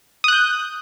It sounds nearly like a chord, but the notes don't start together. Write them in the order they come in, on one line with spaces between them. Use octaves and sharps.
D#6 F#6 G6